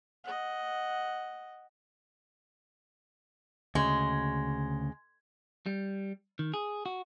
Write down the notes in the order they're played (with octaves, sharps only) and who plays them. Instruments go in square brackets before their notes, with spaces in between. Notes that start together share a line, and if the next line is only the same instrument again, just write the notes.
[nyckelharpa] D#5 F#5
[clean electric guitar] D2 C#3 [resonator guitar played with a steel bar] G#3
[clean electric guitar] G3
D#3
G#4
F#4